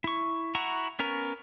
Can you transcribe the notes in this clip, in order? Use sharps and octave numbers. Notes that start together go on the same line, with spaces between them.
E4 C#6
E4 F#4 F#5 A#5 C#6
B3 C#4 A#4 A#5